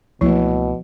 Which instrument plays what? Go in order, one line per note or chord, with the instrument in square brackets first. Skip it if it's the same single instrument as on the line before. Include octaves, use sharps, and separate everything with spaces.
[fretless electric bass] C#2 A3 A#3 [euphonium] B2 [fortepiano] E3 [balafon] F3